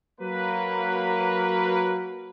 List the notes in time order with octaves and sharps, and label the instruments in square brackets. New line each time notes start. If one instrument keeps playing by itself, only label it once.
[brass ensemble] F#3 A#3 B4